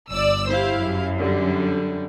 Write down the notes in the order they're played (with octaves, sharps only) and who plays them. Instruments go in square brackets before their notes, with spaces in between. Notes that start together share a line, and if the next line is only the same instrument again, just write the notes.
[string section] G1 D5 E6
[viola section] E4 G4 F5 [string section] C5
[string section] F#2
[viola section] D3 G3